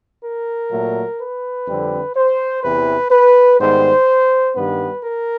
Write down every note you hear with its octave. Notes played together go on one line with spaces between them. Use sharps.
A#4
A#2 F#3 A3
B4
F2 D3 G3 C4
C5
E2 C3 E3 B4
B4
G#2 D#3 G3 B3 C5
G2 D#3 G3 B3 B4
A#4